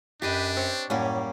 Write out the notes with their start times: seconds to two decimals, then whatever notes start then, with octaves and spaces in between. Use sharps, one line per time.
0.22 F#2 D4 G4 B4 D#5
0.57 C4 C#5
0.90 F#2 A2 G3 A#3 C#4